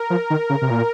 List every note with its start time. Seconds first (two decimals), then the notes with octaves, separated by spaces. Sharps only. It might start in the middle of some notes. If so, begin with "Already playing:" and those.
Already playing: A#4
0.10 F3
0.30 D#3
0.50 C#3
0.62 C3
0.70 A#2